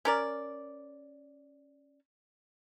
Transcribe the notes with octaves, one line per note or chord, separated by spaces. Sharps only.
C#4 A#4 D5